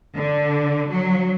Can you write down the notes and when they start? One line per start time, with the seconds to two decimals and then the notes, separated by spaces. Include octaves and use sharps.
0.15 D3
0.89 F#3